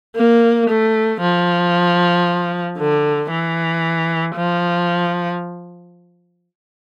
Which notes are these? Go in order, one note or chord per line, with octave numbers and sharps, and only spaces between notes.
A#3
A3
F3
D3
E3
F3